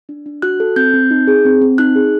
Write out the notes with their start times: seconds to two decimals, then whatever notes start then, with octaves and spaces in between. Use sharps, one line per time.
0.09 D4
0.26 D4
0.42 F#4 F#6
0.60 A4
0.76 C4 G6
0.94 C4
1.11 D#4
1.27 G#4
1.45 C4
1.62 C4
1.78 D#4 F#6
1.95 G#4